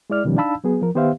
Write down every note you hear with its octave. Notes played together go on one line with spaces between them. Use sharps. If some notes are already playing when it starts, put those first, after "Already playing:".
G#3 E4 D5 F6
B2 D#3 F3 G3 C#4
D4 D#4 F5 A5 B5 E6
F#3 B3 G#4
F3 A#4
D#3 B3 G4 C5 E5 F5